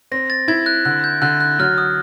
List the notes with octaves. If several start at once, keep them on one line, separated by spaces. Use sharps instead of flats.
C4 A#6
A6
E4 G#6
F#6
D3 F#6
G6
D3 F#6
F#6
F#3 F6
D#6